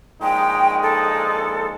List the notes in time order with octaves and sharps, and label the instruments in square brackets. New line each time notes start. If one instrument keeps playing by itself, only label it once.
[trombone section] A#1 G#3 D#4 [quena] G5
[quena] A4